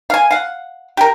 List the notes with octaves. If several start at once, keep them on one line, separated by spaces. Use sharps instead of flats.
F5 G#5
F5 F#5
G4 A#4